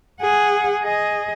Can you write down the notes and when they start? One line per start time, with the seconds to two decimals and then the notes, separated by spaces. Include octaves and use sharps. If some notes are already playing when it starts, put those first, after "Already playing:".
0.21 G#4 F#5
0.82 G#4 D#5